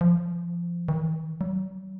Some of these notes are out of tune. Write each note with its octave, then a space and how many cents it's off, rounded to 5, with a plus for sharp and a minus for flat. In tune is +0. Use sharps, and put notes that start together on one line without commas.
F3 -20
D#3 +40
F#3 +35